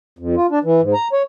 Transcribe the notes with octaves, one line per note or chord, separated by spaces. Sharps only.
F2
F4
D4
E3
G#2
A#5
C#5